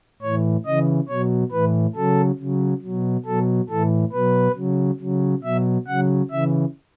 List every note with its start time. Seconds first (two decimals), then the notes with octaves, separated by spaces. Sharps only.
0.22 A2 E3 C#5
0.66 C#3 E3 D#5
1.09 B2 F#3 C#5
1.52 A2 E3 B4
1.96 C#3 F#3 A4
2.39 C#3 F#3
2.82 B2 F#3
3.26 B2 F#3 A4
3.70 A2 E3 A4
4.13 B2 F#3 B4
4.56 C#3 F#3
5.00 C#3 F#3
5.43 B2 F#3 E5
5.87 C#3 F#3 F#5
6.30 C#3 E3 E5